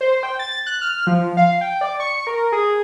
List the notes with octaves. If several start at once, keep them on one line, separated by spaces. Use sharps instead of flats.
C5
G5
A6
F#6
F6
F3
F5
G5
D5
C#6
A#4
G#4